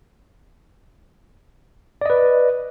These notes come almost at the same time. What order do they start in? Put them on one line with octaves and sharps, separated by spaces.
D5 D#5 B4